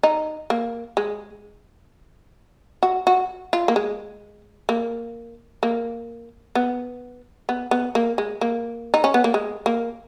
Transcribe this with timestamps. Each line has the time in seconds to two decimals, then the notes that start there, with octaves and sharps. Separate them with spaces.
0.03 D#4
0.50 A#3
0.97 G#3
2.83 F#4
3.07 F#4
3.53 F4
3.68 A#3
3.76 G#3
4.69 A#3
5.63 A#3
6.55 B3
7.49 B3
7.71 B3
7.95 A#3
8.18 G#3
8.41 A#3
8.94 D#4
9.04 C#4
9.14 B3
9.24 A#3
9.34 G#3
9.66 A#3